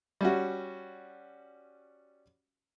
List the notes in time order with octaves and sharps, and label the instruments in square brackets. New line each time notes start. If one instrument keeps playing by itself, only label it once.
[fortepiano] G3 C#4 F#4